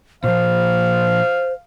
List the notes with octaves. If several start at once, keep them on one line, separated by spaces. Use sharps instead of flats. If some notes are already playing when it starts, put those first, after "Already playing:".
A#2 F3 C5 F5